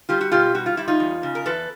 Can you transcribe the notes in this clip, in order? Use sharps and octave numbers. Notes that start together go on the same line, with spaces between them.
G3 F4 G4
F#4
B2 F4 G4
G3 F#4
F4
G3 E4
D#4 F4
E2
C#3
A#4
E2 A4 B4